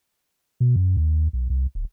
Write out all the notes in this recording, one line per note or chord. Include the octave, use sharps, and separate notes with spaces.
B2
F#2
D#2
B1
C2
D1